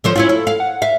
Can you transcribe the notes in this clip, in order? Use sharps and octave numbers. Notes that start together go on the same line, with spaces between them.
D3 F3 C5
C#4 E4 F4 F5
E4 A4
F5
F#5
E5 F5